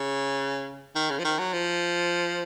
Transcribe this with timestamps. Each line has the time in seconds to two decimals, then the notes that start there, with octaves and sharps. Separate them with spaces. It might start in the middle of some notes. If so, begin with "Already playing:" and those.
Already playing: C#3
0.96 D#3
1.10 C#3
1.19 F3
1.24 D#3
1.39 F#3
1.53 F3